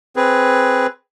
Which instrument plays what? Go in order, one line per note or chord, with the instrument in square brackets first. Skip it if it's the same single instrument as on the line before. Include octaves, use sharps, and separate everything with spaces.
[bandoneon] C4 G#4 B4